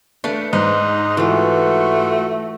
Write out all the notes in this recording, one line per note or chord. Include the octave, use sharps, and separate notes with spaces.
A3 D4 B4 F5
G#2 D#4 C5
E3 A3 F4 F#4